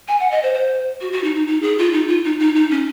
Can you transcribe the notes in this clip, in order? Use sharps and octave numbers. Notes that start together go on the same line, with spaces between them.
G#5
F#5
D#5
C5
C5
F#4
F#4
D#4
D#4
D#4
G#4
F4
D#4
F4
D#4
D#4
D#4
C#4